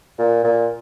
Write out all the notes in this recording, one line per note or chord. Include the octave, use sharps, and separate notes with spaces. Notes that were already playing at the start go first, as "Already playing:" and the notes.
A#2
A#2